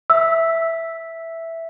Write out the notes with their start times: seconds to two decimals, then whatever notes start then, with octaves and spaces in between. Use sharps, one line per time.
0.10 E5 E6